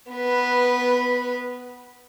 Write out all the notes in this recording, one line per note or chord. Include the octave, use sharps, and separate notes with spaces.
B3 B4